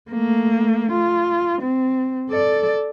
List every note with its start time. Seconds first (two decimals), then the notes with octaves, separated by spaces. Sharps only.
0.11 A3 A#3
0.92 F4
1.61 C4
2.30 A4 D5